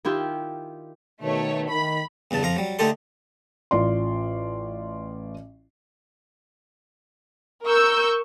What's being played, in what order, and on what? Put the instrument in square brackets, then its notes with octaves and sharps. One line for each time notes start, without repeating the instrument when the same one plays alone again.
[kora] D#3 E4 F4 G4
[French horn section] B2 D#3 [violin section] A3 C#5
[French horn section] D#3 [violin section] B5
[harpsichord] E2 G2 C#3 A5
F2 F3 F5 A#5
F#3 G3
D3 A3 D#4 G4 A4 C6
[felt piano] A1 F4 D5 C6
[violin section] A#4 C#6 E6 G6